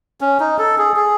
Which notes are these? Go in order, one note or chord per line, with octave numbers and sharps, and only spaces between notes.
C#4
D#4
A4
G#4
G#4